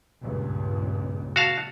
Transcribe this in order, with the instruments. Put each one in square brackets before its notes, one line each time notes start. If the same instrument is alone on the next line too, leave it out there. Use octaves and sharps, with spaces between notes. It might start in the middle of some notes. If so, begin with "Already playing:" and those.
[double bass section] C#2 G2 A#2
[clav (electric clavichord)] F#4 F5 A5